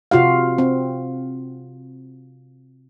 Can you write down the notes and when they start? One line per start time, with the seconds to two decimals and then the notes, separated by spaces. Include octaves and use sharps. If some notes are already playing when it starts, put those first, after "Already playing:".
0.11 C3 F4 F#4 F5
0.58 C4